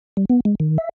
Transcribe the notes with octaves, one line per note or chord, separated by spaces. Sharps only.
G3
B3
G#3
D#3
E5